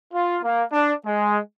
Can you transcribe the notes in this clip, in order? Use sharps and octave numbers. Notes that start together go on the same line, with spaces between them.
F4
A#3
D4
G#3